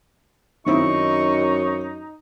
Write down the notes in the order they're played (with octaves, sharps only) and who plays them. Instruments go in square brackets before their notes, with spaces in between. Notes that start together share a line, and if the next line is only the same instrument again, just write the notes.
[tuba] F#2 [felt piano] D#3 C4 E4 [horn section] D#4 [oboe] C#6